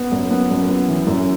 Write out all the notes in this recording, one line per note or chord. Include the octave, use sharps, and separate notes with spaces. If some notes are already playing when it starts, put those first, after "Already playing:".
Already playing: B3
F#2
B3
F#2
B3
E3
F#2